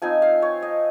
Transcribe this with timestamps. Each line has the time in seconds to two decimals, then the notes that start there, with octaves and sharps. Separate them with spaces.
0.02 F3 C4 D#4 G#5
0.22 F5
0.42 C#5
0.62 D#5